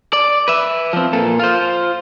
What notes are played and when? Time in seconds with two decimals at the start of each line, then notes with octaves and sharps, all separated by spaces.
0.13 D5
0.48 B4 E5
0.93 F3 C4
1.13 A#2 A4
1.40 F4 C5